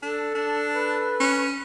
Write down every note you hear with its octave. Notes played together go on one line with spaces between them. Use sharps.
D4 A4
D4
B4
C#4